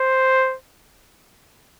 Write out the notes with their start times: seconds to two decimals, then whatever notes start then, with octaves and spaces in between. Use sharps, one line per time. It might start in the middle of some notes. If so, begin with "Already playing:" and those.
Already playing: C5